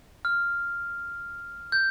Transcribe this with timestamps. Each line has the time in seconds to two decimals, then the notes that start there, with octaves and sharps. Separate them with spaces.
0.25 F6
1.72 G6